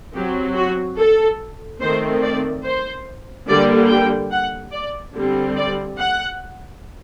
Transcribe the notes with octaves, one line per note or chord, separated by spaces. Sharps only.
F#3 C4 G4
F#4
A4
D#3 A3 C4 C5
D5
C5
D3 G3 A#3 D5
G5
F#5
D5
D3 G3 C4
D5
F#5